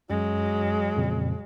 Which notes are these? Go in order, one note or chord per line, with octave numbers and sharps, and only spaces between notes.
F#2 F#3 G#3
F2 A#2 C#3